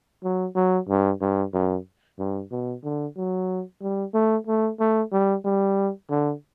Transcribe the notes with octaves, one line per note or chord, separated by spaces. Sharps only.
F#3
F#3
G2
G2
F#2
G2
B2
D3
F#3
G3
A3
A3
A3
G3
G3
D3